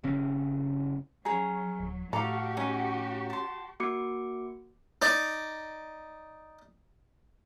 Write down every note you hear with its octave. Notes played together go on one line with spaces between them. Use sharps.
F#1 C#3 C4 C#4
F#3 C#4 G#4 A#5
D#1
A2 F#4 G4 A4 D5 F5 A#5
C#4 D#4
A5 C6
A#3 F#4 D6 C#7
D#4 D5